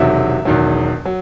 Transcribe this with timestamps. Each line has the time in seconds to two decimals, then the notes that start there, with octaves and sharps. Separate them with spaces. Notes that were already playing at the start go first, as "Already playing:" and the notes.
Already playing: E1 E2 C3 D#3 F#3 E5
0.45 E1 E2 D#3 F#3
1.05 F#3